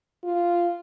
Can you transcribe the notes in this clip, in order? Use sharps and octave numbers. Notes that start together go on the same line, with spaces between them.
F4